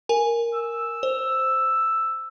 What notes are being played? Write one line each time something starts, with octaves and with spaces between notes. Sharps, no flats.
A#4 G#5
E6
C5